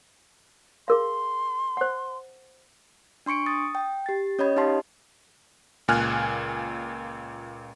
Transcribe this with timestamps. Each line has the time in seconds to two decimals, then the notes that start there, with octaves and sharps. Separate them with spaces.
0.88 G#4 A#4 F5 C6
1.77 C5 F#5
3.26 D4 C6 C#6 C#7 D7
3.46 D#6 A6
3.75 G5
4.06 G4 A6
4.39 C#4 C#5 D#5 B5 G#6
4.56 D#4 G4 D#5 F5 A5 C6
5.88 C#2 A#2 G#5 F6 F#6